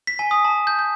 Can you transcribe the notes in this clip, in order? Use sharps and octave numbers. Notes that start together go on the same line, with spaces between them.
B6
G#5
D#6
A5
G6
G6